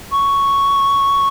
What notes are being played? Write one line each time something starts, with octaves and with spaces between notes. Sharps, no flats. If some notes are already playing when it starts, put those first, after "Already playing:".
C#6